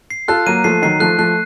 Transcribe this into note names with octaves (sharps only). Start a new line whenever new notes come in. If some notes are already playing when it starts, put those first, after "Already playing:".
C7
F4 A4 F#6
F#3 A#3 D#7
F3 A3 C7
D#3 F#3 C7
F3 A3 F#6
F3 A3 F#6